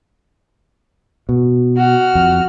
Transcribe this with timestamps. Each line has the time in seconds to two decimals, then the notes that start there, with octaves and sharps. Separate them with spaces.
1.29 B2
1.77 F#4 F6
2.15 F2